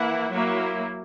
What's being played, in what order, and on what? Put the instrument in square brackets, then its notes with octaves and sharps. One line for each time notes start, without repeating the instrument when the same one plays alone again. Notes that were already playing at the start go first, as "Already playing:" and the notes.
Already playing: [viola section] E3 A#3 E4 [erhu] F#5
[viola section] F#3 A#3 E4